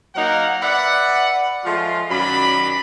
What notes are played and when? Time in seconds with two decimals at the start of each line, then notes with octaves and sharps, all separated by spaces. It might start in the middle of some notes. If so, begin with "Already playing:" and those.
0.15 F#3 A#3 D#4 A#4 F5 F#5
0.62 B4 D5 E5 F#5
1.65 F3 G#3 A3 F4
2.11 F#2 D#3 F#3 D5 B5